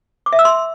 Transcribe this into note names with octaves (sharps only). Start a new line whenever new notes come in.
D6
E5
E6
C6